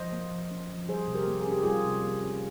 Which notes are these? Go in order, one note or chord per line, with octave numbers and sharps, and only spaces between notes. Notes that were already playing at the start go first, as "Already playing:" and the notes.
Already playing: F3 C5 D#5
A#3
F3
C#4
F3
G3 G#4 C5
C3
G4 A#4
A#3
G#4
C#4
G4
G3 F4 G#4
C3
A#3
C#4